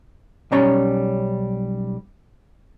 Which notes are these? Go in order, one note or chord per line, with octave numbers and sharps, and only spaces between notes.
B1 G3 C#4 C#5 A#5